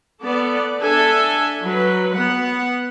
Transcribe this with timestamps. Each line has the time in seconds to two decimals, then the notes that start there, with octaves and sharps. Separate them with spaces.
0.22 B3 A4 D5
0.82 D4 A4 E5 G#5
1.63 F#3 B4
2.15 B3 F#5